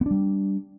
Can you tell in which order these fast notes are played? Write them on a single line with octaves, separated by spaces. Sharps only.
B3 D4 G3